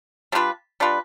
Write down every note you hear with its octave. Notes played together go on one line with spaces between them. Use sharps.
G3 D4 F4 B4
G3 D4 F4 B4